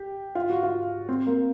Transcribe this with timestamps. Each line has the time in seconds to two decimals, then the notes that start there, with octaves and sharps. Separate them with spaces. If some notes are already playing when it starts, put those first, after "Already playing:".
Already playing: G4
0.35 F4
0.50 F#4
0.63 F4
1.09 C4
1.27 A#3